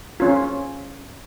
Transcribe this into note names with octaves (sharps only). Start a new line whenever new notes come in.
C#4 F4